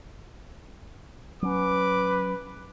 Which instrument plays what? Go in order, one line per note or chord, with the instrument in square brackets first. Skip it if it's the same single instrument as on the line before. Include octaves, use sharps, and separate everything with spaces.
[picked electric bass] F#3 C#4 [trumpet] B4 [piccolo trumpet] D6